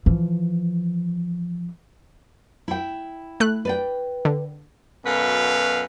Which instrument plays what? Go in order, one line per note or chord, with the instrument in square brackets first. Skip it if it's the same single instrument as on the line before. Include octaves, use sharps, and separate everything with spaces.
[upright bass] E3 F3
[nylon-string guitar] E4 G5
[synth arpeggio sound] A3 F#6
[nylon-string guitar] B4 D5 G5
[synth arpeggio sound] D3
[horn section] F#2 B2 A4 B4 F5